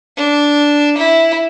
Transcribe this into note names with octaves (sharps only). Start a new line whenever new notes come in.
D4
E4